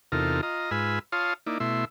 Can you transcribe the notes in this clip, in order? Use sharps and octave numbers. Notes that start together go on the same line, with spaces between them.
E2 C3 D#4 F4 A4 A#4
F4 D#5 A#5
G#2 F4 B4 G#5 B5 E6
F4 C#5 F5 A5 C6 D#6
A#3 D#4 E4 D5
B2 A3 E4 E5 C6